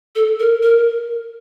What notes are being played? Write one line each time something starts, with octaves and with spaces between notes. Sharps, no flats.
A4
A#4
A#4